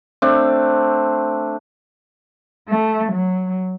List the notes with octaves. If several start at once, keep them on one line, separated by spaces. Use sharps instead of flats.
A3 C4 D4
A3
F#3